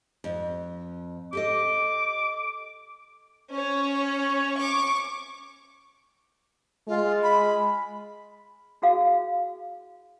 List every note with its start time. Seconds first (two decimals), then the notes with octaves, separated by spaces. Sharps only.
0.24 F2
1.33 G4 A4 D#5 D6
3.52 C#4 C#5
4.58 C#6 D6
6.88 G#3 F4
7.23 B5
8.82 E4 F#4 G#4 F5